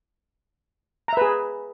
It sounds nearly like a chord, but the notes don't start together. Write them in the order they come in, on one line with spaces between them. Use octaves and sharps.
A#5 E5 B4 G#4